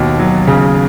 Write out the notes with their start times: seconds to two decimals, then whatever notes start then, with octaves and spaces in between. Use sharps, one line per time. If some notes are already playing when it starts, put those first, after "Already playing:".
Already playing: D#2 B2
0.19 F#3
0.47 C#3